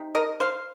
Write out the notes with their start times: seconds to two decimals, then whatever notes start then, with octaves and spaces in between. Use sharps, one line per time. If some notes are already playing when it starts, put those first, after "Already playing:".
Already playing: C3 D#4
0.15 A#4 D#5
0.40 C5 F5